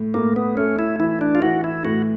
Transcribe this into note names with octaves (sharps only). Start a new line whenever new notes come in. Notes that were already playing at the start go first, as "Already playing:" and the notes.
Already playing: A2
A2 A#3
B3
A3 C#4
E4
E3 E4
D4
F4
E3 F#4
E4
A2 F#4